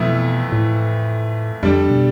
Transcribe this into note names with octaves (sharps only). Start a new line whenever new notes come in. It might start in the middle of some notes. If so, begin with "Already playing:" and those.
Already playing: F2 B2 E3 A3 E4
A2
F2 D3 G3 D4
B2